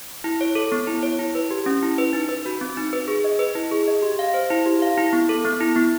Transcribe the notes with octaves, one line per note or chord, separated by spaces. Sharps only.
E4
C#5
A4
B3
E4
C#5
E4
B4
G4
C#4
E4
B4
D#4
B4
F#4
C4
D#4
B4
G#4
D#5
B4
E4
G#4
D#5
G4
F5
C5
E4
G4
F5
E4
B3
A4
B3
E4
B3